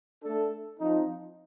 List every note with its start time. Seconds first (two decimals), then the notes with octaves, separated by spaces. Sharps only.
0.23 A3 D4 A4
0.79 F3 C4 D#4